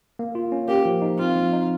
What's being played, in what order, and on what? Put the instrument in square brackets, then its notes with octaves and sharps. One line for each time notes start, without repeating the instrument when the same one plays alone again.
[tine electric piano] A#3
F4
C#4
[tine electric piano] A#3 [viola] G4
[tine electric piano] F3
D#4
[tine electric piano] C4 [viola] F4
[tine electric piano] F3
D#4